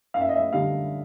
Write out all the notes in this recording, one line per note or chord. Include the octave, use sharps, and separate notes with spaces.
F#2 F5
E5
D#5
E5
D3 G3 F5